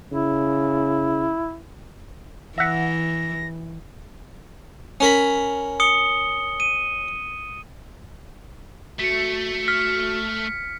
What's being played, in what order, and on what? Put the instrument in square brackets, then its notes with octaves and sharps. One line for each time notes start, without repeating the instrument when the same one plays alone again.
[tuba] C#3 [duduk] E4
[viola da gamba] E3 [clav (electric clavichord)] E5 F#5 [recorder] A#6
[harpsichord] C#4 A#4 B5
[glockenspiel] D#6 C#7 G7
D#7
[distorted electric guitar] A3 [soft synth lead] F#4 [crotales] B6 C#7
[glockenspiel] F6 [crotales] B6